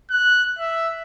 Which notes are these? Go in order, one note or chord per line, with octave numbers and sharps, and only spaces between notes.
F#6
E5